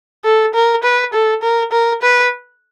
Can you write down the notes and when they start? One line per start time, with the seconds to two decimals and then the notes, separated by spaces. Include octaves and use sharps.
0.24 A4
0.54 A#4
0.83 B4
1.13 A4
1.42 A#4
1.72 A#4
2.02 B4